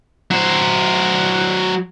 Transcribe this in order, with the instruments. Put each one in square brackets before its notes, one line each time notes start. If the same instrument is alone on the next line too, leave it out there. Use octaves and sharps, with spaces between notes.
[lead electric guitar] F#3 C5